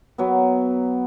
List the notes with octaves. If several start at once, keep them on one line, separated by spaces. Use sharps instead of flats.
F#3 B3